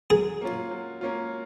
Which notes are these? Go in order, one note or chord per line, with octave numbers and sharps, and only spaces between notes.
F#3 G#4
A#3 C#4 F4
F#3
A#3 C#4 F4